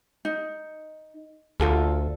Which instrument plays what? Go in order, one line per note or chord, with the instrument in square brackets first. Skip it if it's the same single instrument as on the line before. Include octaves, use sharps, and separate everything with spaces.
[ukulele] D#4
[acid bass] D2 [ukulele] F4 A4 A#4